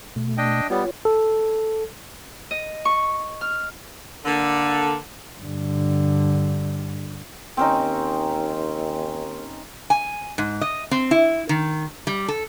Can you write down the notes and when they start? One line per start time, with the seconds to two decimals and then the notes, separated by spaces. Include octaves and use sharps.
0.16 B2 A3
0.37 D4 D#5 G5
0.70 G3 B3 F4 C#5
1.05 A4
2.51 D#5
2.85 C#6
3.41 F6
4.25 D3 A#3 A4
5.41 G2 D3
7.57 D#2 C4 C#4 D#4
9.90 G#5
10.38 G#2
10.61 D#5
10.91 C4
11.11 E4
11.49 D#3
12.07 G3
12.28 A4